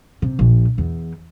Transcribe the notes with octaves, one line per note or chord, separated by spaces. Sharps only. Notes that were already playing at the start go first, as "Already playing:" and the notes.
C3
A#1
E2